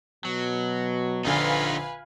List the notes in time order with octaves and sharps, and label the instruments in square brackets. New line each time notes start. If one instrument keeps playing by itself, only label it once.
[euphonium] B2 [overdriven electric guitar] F#3
[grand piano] A#1 D3 F6 [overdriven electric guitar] D#4 F4 [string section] B4 F5 G#5